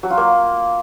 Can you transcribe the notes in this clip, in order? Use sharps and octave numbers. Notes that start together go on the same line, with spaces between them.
F#3
F4
A#3